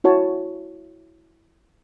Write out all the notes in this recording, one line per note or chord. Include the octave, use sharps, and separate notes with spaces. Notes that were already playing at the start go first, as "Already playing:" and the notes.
E4 F#4 C#5 A5